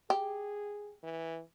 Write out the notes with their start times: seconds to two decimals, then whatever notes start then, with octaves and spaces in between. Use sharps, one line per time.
0.10 G4 G#4
1.03 E3